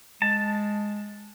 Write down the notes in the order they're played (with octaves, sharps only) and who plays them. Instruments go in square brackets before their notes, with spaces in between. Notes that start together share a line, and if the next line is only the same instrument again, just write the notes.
[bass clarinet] G#3 [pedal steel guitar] A5